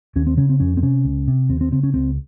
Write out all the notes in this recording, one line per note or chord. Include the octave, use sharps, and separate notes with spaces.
D#2 C#4
C4
C#3 C#4
C4
F2 C#4
C4
C3 C#4
C#2
C3
D#2 C4
C4
C#3 C4
C#4
C#2 C4